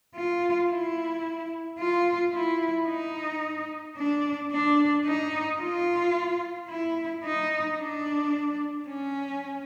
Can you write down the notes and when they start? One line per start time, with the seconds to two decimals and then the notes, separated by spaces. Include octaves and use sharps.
0.15 F4
0.69 E4
1.78 F4
2.33 E4
2.88 D#4
3.97 D4
4.51 D4
5.05 D#4
5.60 F4
6.69 E4
7.24 D#4
7.79 D4
8.88 C#4